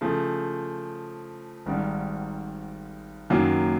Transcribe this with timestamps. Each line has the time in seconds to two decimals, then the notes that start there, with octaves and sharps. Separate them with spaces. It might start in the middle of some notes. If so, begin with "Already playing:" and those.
0.01 C#3 F3 A3
1.66 G#1 G#2 D#3 G3
3.30 F#1 F#2 D#3 F#3 A#3